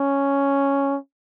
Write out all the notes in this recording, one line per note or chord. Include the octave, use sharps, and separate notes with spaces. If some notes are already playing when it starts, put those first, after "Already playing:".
Already playing: C#4